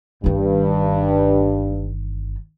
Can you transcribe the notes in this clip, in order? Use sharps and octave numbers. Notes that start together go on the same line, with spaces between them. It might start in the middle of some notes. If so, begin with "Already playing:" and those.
G1 G2 D#3